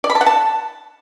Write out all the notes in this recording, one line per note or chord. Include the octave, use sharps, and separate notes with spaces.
D5
B5
A5
F#5
A5